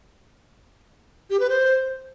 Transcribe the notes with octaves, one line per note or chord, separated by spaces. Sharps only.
G4
B4
C5